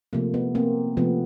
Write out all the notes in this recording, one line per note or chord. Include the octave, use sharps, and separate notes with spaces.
C3 F3 A3 A#3
B3
A#3 C4
C3 F3 A3 B3